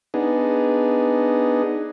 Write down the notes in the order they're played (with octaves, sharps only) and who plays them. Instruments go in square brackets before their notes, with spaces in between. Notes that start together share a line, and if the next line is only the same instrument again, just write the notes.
[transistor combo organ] B3 D4 D#4 G#4